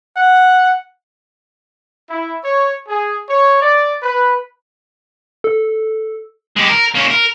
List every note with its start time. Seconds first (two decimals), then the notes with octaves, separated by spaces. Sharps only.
0.16 F#5
2.09 E4
2.43 C#5
2.88 G#4
3.28 C#5
3.61 D5
4.02 B4
5.44 A4
6.57 G#3 G4
6.70 A#4
6.95 A#3 C#4
7.11 A#4